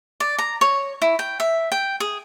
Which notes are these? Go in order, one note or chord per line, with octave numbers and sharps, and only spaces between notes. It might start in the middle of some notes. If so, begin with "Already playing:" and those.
D5
A#5
C#5
E4
G5
E5
G5
G#4